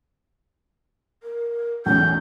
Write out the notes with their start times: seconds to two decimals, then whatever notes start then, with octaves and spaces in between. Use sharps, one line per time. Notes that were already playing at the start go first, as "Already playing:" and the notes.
1.23 A#4
1.86 B1 E2 A2 C#4 G6